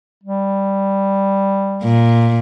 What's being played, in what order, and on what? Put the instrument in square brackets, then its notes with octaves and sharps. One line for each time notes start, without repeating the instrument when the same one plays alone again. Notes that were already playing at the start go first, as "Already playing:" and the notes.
[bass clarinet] G3
[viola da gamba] A#2